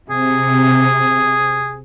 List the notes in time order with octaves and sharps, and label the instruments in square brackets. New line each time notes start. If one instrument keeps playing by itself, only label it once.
[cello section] C3 [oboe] G#4